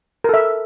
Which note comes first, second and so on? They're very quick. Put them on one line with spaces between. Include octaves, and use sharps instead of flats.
A#4 A4 E5